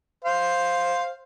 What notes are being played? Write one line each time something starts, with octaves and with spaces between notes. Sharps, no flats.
C5 F5